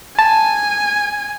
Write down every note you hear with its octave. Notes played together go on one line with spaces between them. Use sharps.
G#5 A5